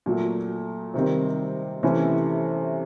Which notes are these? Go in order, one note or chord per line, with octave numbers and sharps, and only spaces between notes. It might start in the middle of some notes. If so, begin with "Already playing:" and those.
A#2 F#3 A3
C3 D#3 G3 C4
C3 E3 A3 C#4 E4